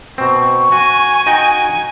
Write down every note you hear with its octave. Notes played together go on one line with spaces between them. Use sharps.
B2 C4 C#6
F#4 G#5
D#4 F#4 G5